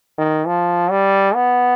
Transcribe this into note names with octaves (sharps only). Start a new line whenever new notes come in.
D#3
F3
G3
B3